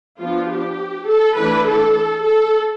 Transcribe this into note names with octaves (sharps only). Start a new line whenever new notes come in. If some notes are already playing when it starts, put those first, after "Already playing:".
F3 B3 D4 F4
G4
A4
E3 A3 D4 B4
A4
A4